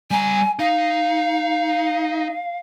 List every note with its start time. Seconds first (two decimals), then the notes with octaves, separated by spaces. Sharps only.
0.11 G3 G#5 A#5
0.59 D#4 F5